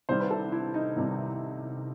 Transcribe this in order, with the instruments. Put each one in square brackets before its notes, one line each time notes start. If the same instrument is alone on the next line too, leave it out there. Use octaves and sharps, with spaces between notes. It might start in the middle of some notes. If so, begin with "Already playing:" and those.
[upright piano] C2 C3 D#3 G3 C5
B4
A4
E4
D#4
C2 C3 D#3 G3